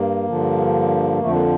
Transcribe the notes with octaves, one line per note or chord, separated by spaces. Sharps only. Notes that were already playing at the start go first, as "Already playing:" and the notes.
Already playing: G2 A#3
G2 D3 F3
F2 D3 F3 A3
A#3